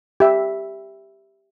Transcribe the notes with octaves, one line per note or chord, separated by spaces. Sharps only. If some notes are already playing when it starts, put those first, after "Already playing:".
G4 E5